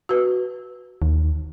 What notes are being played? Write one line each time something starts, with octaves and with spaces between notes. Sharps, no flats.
F#4 B4
D#2